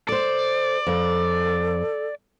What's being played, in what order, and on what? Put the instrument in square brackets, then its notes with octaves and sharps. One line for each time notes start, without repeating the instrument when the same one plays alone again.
[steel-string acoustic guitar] A4 C5 [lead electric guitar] D5
[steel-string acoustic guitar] F2 [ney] A4